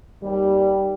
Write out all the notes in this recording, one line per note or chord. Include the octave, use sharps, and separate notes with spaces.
D#2 G3